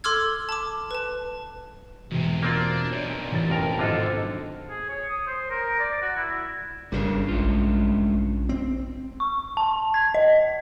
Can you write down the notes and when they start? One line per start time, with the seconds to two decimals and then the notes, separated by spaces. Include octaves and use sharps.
0.04 A4 C6 D6 E6 F6 G#6
0.49 A5 D6
0.91 B4 A5
2.11 E1 G#2 C3
2.43 A#3 C4 D4 F4 D5
2.91 B1 A#2 C#5 D5
3.32 A1 A6
3.50 F2 A#4 A#5
3.79 G#1 D3 F4 A4 C5 D#5
4.69 G#4
4.89 C#5
5.09 D#6
5.27 C5
5.50 A#4
5.80 D5
6.02 F#4
6.17 E4
6.92 G1 G2 C#3 G3 D4 A#4
7.28 A#1 G#3 A3 F4
7.97 A#1
8.49 C4
9.20 C#6
9.57 A5
9.94 G#6
10.14 D#5